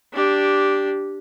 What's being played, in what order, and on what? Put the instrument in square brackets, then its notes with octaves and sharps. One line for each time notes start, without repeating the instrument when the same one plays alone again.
[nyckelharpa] D4 G4